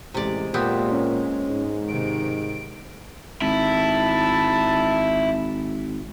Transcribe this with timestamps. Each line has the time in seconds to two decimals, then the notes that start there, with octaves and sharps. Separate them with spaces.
0.14 A1 C3 G#3 D5
0.54 A#2 B3 C4 G4
0.92 C#4
1.48 G#2
1.88 C3 D#3 D7
3.42 G#1 E4 A5